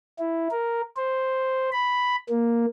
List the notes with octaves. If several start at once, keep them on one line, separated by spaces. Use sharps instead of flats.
E4
A#4
C5
B5
A#3